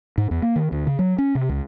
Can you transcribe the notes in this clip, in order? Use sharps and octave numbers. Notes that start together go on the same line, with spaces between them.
G#2
E2
A#3
D#3
D2
C#3
F#3
C#4
C3
C#2